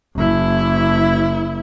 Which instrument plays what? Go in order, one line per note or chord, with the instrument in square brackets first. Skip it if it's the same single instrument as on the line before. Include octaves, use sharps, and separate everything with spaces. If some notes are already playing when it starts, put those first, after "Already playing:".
[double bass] F#1 E4